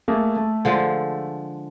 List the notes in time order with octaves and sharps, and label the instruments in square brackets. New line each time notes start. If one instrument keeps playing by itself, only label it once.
[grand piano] A3 A#3 G#4
A3
[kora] D3 F3 G#3